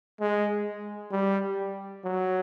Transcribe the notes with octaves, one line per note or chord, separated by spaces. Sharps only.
G#3
G3
F#3